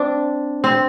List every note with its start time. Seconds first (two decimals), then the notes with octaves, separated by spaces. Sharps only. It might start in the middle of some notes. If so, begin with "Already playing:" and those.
Already playing: C4 D4
0.64 C4